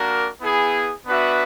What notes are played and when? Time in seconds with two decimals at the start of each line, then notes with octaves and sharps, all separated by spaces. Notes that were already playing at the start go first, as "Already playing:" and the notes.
Already playing: A#3 D4 F#4 A#4
0.41 B3 E4 G#4
1.06 B3 D4 F#4 B4 E5